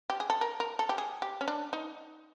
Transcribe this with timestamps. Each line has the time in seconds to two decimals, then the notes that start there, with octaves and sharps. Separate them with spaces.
0.10 G4
0.20 G#4
0.30 A4
0.41 A#4
0.60 A#4
0.79 A4
0.89 G4
0.98 G#4
1.22 G4
1.41 C#4
1.48 D4
1.73 D#4